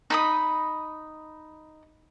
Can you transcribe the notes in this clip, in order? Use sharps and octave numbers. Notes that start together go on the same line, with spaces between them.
D#4 B5 D#6